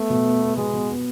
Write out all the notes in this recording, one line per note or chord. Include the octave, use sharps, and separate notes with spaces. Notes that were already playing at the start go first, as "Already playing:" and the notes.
Already playing: A3 B3
B2
B3
B3
B2 G#3
B2
B3